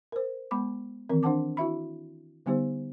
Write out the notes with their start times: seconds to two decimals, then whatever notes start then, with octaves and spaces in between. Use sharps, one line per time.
0.12 A#4 C5
0.51 G#3 B3 B5 D6
1.09 D#3 E3 C4 A#4
1.23 D4 C5 F#5 A5 D6
1.57 E4 F#4 E5 B5
2.46 D3 G3 B3 D#4 G4 C5